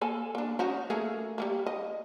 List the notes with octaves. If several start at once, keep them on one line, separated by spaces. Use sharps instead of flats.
A#3 A4 G#5
A#3 D4
C#4 D#4 F#4
A3 A#3 G#4
G3 A3 A#3
D#5